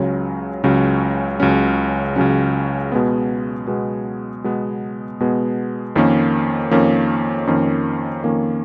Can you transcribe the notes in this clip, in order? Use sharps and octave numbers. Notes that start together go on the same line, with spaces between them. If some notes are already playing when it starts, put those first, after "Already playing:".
Already playing: C#2 C#3 F#3 C#4
C#2 C#3 F#3 C#4
C#2 C#3 F#3 C#4
C#2 C#3 F#3 C#4
B2 G#3 B3
B2 G#3 B3
B2 G#3 B3
B2 G#3 B3
F2 D#3 A#3 C#4
F2 D#3 A#3 C#4
F2 D#3 A#3 C#4
F2 D#3 A#3 C#4